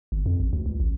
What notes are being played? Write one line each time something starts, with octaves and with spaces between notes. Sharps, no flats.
G1
F2
A1
D2
C#2
A1